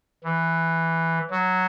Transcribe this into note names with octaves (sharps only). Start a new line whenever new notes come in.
E3
F#3